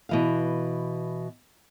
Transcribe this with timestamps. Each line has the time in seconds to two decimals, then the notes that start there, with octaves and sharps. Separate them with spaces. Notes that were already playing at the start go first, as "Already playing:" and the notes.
0.09 B2 E3 F5